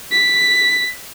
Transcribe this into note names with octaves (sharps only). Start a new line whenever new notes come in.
B6